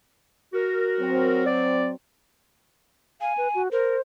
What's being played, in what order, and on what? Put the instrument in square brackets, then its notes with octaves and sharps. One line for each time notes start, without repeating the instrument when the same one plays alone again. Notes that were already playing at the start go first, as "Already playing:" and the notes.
[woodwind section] F#4 A#4
[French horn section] F#3 C4
[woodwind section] D5
[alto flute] F5 [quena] G#5
[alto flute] B4
F#4
[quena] A#4 [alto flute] C5